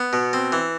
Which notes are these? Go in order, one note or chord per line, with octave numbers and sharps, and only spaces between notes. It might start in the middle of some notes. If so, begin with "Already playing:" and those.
Already playing: B3
B2
C4
E3